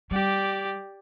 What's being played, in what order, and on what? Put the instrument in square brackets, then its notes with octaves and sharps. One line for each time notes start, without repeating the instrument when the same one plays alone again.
[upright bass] G3 [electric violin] G4 D5